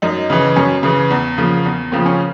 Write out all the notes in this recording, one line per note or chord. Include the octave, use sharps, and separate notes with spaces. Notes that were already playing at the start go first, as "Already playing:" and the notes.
F#2 D#4
C#3 E3
F#2 C#4
C#3 E3
E2
C#3 F3 A#3
E2
C#3 F3 A#3 C4
C#4